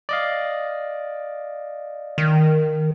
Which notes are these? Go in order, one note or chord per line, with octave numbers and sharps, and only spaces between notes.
D5 D#5 F5
D#3